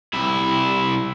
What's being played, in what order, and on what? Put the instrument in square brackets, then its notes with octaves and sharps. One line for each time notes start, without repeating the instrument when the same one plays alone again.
[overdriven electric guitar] C2 E4